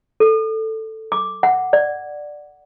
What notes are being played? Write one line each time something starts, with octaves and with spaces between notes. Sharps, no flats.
A4
D6
F#5
D5